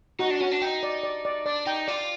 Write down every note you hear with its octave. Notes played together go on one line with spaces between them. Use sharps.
D#4 F#4
D4
C#4 F#4
D4
D#4 G5
D5
D5
D5
D4 D5
D#4 G5
F4 D5